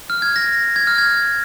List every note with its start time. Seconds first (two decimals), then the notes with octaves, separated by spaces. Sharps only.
0.10 F6
0.22 G#6
0.36 A#6
0.76 G#6
0.87 F6
0.98 G#6